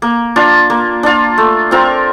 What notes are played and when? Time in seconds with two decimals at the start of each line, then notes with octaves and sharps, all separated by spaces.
0.02 A#3
0.36 D4 F4
0.70 A#3
1.03 D4 F4
1.38 A3
1.71 C4 F4 A#4